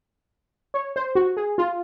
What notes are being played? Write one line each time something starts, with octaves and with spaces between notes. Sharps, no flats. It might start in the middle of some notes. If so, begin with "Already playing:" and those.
C#5
C5
F#4
G#4
F4